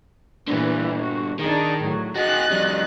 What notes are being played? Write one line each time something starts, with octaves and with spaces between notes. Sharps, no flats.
G2 A#2 D3 E3
F#4
D#3 D4 D#4 G#4
A2 F#3
F#4 G#4 D#5 F#6 A6
F2 G3